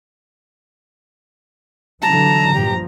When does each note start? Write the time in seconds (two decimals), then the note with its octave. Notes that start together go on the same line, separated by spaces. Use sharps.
2.02 D3 E3 F#3 A5 A#5
2.54 G2 A#2 F3 G4